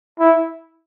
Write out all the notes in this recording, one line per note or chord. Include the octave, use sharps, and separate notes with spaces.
E4